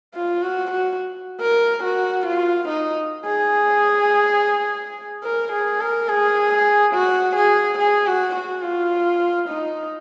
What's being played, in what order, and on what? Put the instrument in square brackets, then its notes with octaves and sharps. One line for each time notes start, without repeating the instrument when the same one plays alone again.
[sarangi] F4
F#4
F#4
A#4
F#4
F4
D#4
G#4
A#4
G#4
A#4
G#4
F#4
G#4
G#4
F#4
F#4
F4
D#4